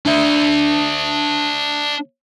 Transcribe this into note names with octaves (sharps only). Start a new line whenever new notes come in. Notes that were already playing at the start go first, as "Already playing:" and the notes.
D4 E5